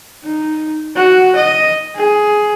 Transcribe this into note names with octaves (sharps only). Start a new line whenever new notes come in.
D#4
F#4
D#5
G#4